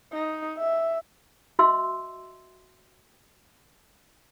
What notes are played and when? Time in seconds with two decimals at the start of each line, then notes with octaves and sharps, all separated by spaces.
0.13 D#4
0.58 E5
1.59 F#4 D#5 E5 C6 E6